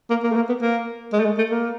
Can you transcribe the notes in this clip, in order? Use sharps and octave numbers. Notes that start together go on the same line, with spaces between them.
A#3
A#3
A3
A#3
B3
A#3
G#3
A3
G#3
A3
A#3